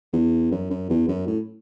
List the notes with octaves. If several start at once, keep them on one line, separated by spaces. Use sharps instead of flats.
E2
F#2
F#2
E2
F#2
A2